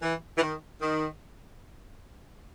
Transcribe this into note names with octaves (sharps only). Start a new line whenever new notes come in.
E3
E3
D#3
D#3